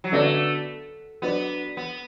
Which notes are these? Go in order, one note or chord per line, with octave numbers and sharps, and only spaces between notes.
F#3
D3 A3 B3 F#4 A4 D5
F#3 B3 D4 B4 D5
B3